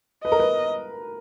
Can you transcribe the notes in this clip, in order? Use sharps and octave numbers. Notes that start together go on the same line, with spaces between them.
B4 D#5
A#4
B4